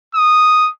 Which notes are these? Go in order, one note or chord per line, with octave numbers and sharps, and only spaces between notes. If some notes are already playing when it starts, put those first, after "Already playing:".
D#6